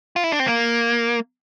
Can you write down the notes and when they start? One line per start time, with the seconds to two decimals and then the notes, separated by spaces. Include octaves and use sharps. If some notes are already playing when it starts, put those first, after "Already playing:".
0.16 F4
0.24 E4
0.32 D4
0.40 C4
0.47 A#3